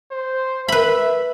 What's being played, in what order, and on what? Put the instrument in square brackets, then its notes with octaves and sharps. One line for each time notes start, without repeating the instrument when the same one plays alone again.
[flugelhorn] C5
[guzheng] B4 B5 [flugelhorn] E5